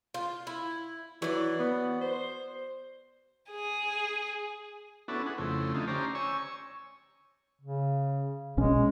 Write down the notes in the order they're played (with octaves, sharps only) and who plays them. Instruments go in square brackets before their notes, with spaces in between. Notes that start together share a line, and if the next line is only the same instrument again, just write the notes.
[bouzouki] F4
E4
[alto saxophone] E3 [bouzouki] F#3 D5
[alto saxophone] B3
C5
[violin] G#4
[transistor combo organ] B3 C#4 D4 E4 F#4 A4
G#4 F#5
F2 C#3 A3 C4 E4
D3 A3 D#4 F4
C#4 G4 C5 D5 A#5
C#5 G#5 C#6 E6
[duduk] C#3
[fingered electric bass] A#1 B2 C#4 [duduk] G#3